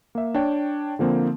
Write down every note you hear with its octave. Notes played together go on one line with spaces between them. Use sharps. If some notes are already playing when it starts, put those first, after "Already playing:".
A#3 E5
D4 C#5 G5
D3 F3 A#3 C4